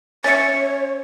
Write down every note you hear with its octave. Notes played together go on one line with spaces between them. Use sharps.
C#4 C#5 E5 A6 C#7